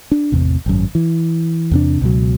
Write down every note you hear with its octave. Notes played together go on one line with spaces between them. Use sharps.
D4
A1 E2 C3
G#1 F#2
E3
E2 C3 D4
C#2 B2 F#3